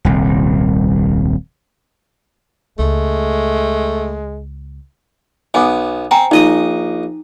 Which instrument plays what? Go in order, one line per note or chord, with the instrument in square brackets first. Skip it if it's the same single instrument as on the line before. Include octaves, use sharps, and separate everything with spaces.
[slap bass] D#1 C2
[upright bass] C#2 [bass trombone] G#3 [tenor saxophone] A3
[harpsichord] B1 B3 [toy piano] G#5 D6 D#6
[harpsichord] C4 [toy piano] G5 G#5 A#5
[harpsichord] A#1 D#5 D#6 [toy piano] D#4